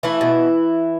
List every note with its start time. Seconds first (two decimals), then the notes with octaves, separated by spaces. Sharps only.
0.03 E3 A3 E4
0.21 B2